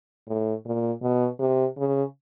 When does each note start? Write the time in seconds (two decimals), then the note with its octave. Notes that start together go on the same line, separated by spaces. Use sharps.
0.28 A2
0.65 A#2
1.02 B2
1.39 C3
1.77 C#3